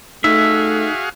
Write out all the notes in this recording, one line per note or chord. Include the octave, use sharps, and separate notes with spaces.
A3 D#4 F#4 G#4 E5 F5